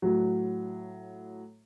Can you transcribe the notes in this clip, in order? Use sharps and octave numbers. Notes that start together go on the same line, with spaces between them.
A2 F#3